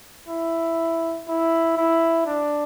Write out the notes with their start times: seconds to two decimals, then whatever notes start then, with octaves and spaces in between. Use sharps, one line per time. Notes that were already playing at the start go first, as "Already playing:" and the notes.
0.28 E4
1.28 E4
1.77 E4
2.26 D4